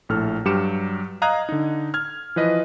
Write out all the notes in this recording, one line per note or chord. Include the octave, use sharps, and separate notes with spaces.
A#1 A2 A4 F6
G2 F#3 G4 D6 C#7 E7
D#5 F5 A#5 D#6 F#6 G#6
D3 D#4
F6 G#6
E3 F3 B4 D#5